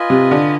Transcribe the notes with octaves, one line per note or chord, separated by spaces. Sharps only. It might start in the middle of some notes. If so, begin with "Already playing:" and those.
Already playing: F4 B4 D#5 G#5
C3
D3